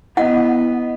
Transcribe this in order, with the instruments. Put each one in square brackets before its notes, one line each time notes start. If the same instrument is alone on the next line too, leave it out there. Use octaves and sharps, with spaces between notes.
[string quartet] B3 [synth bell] E4 D#5 [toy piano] F#5